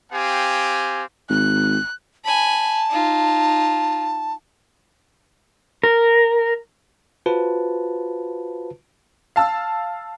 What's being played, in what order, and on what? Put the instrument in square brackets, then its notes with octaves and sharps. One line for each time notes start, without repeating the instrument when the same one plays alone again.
[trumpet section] C4 G4 F5 G#5
[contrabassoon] G#1 [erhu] F#6
[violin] G#5 B5 [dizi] A5
[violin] D#4 F4
[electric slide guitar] A#4
[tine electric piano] F4 F#4 B4 C5 A5
[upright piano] F5 A5 E6